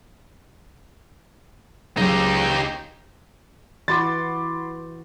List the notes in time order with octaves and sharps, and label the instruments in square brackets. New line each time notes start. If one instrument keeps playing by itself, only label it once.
[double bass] C#2 [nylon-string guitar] C#3 F#3 C5 [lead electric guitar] D#4 G4
[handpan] E3 F#4 [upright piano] B5 C6 D6 [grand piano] A6